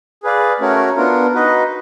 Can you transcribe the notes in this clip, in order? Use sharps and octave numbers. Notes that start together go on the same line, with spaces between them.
G#4 B4 D5 F5
A3 C#4 F#4 A#4 C#5
B3 D4 F4 A#4
D#4 F#4 B4 D#5